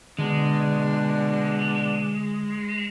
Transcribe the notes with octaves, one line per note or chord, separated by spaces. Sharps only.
B2 D3 G#3 D4